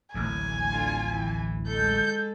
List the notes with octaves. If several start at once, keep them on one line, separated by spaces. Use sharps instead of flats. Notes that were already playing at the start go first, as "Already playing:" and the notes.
D1 A1 D#2 A#3 G#5
D3 F4
E3
G#3 A4 G6